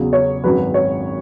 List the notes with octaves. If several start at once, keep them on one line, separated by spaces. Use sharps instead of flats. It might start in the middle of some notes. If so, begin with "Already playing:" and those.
Already playing: E2 C#3 F#3
C#5
G#1 F#2 F#3 B4
C#5